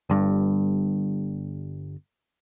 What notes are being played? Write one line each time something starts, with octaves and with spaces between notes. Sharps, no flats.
G1 G2